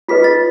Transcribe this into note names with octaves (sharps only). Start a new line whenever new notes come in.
F4 G#4 B4 D#5 B6
A6